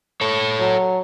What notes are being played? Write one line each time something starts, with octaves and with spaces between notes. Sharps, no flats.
A4 C#5
F#3